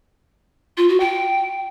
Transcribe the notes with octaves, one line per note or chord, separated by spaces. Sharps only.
F4
F#4
G5